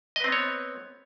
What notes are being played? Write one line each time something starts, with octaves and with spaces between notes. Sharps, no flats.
B3 C4 B4 C#5 D#5